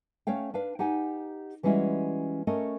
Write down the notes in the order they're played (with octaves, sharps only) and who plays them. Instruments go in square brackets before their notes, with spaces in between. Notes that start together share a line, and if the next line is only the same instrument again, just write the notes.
[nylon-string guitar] A3 C#4 C#5 F5 G5
D4 B4 F5
D#4 G4 F#5 G#5
E3 G3 G#3 C#4 E4 F#4
A3 C#4 A#4 D#5